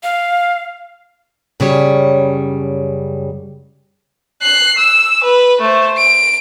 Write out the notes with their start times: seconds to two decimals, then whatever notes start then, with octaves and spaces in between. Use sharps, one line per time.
0.03 F5
1.60 F#2 C#3 G3 C#5
4.42 F#6 C7
4.78 E6
5.24 B4
5.61 A3 C5
5.98 D7